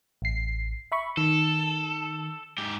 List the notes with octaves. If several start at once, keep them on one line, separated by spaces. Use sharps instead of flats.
A1 C7
E5 B5 C#6
D#3 A4
G#2 G4